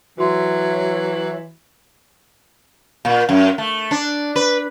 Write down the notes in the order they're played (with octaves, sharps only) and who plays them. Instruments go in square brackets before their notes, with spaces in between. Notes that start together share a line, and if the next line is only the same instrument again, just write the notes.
[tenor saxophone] E3 [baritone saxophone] F#3 [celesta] F#4 C6 [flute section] C#5 E5
[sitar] A#2
F#2
A3
D4
B4